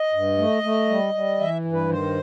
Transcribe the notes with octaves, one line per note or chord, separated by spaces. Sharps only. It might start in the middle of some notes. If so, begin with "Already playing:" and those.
Already playing: D#5
G2
A3
A3
G3
G3
E3 E5
G2
B4
D#3 C5